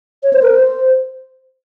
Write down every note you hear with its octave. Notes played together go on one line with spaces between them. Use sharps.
C#5
C5
A#4
C5